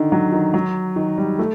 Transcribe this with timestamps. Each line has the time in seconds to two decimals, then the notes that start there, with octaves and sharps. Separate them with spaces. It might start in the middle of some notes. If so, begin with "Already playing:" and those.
Already playing: D3 D#3
0.12 F#3
0.32 D#3
0.54 F#3
0.96 D#3
1.18 G3
1.39 A3